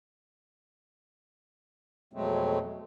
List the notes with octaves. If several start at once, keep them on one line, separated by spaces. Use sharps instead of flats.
F2 B2 F#3 G#3 A3 C4